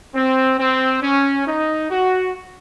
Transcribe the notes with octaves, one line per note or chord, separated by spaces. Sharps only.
C4
C4
C#4
D#4
F#4